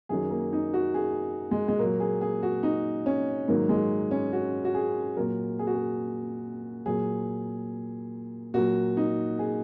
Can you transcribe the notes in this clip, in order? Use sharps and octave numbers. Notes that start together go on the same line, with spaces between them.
F#2 D#3 F#3 G#4
A#3
D#4
F#4
G#4
G#3
G#3
A#2 F#3 A#3
G#4
G#4
F#4
D#4
C#4
G#2 D#3 F#3 A#3
G#3
C#4
F#4
F#4
G#4
A#2 F#3 A#4
G#4
F#4
G#4
A#2 F#3 G#4
A#2 F#3 F#4
D#4
G#4